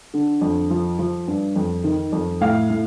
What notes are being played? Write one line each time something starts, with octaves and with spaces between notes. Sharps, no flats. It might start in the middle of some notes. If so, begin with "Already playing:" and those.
D3
F2
F3
F3
G2
F2
D#3
F2
A2 F5
A2